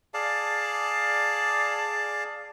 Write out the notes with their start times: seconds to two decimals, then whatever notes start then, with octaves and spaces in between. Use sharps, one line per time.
0.14 G#4 D5 F5 A5